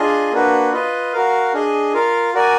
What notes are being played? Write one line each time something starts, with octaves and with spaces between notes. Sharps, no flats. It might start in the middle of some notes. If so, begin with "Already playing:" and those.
Already playing: D4 F4 G#4 D#5
A#3 D4 F#4 B4
F4 B4 D#5
F#4 A#4 F5
D4 G#4 D#5
F4 A#4 F5
F#4 A#4 D5 G#5